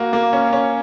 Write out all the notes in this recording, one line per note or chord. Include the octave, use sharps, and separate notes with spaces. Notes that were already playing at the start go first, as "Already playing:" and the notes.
Already playing: A#3 F#4
A#3
C#4
C#4